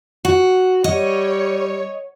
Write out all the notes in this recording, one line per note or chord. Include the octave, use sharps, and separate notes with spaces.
F#4
G3 C#5 D#5